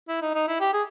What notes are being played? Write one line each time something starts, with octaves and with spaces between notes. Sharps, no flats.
E4
D#4
D#4
E4
G4
G#4